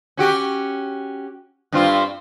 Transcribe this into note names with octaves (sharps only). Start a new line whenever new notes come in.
C#4 F#4 G4
G2 C4 F4